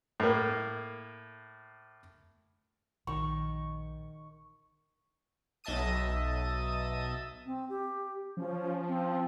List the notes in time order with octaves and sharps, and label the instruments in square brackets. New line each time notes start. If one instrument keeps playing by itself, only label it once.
[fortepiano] A2 A#3
[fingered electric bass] A#1 [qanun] D#3 [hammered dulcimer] C#6
[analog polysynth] B1 D#5 E5 A5 D#6 D#7
[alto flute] C4
G4
[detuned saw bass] F3 [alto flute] C#4
[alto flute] C4